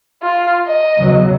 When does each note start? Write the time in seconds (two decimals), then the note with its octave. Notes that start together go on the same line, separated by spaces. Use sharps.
0.22 F4
0.67 D#5
1.01 E2 C#3 F#3